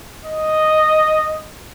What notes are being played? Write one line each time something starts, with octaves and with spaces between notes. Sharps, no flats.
D#5